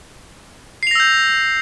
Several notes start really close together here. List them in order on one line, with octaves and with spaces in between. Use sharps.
C7 F7 A#6 E6 G6